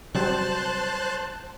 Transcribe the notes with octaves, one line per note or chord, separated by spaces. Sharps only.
C3 F#3 G3 C5 A5 F#6